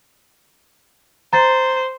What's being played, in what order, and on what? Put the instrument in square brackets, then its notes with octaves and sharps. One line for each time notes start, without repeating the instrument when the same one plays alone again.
[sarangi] C5 [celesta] A#5 A6